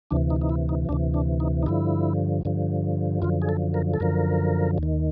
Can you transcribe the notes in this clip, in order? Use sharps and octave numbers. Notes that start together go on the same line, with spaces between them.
D2 C3 E3 D4
D#4
D#4
E4
D#4
D2 C3 E3 D4
D4
D#4
D#4
G2 D3 F3 E4
G2 D3 F3
F#2 D3 F3 F4
G#4
A4
A#4
A4
F#2 D3 F3 A#4
D#2
D#3